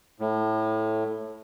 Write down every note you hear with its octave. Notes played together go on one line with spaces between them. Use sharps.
A2